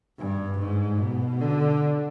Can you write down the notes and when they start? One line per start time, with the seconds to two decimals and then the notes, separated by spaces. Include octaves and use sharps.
0.18 G2
0.59 G#2
1.00 B2
1.41 D3